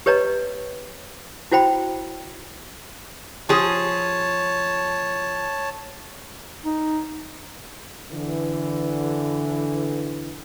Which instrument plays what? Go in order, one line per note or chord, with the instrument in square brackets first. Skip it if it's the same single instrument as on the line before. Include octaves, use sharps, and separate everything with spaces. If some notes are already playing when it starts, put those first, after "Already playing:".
[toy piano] G4 B4 C#5 D#5 A#5
E4 F#4 C5 G5 B5
[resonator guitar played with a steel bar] F3 G#4 [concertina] C#5 A5
[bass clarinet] D#4
[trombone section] D3 E3